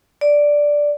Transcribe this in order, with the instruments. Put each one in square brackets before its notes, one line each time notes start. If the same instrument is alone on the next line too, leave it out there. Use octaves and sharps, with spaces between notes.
[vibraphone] D5